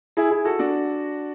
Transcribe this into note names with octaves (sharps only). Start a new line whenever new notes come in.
E4 G#4
E4 G#4
F#4 A4
D4 F#4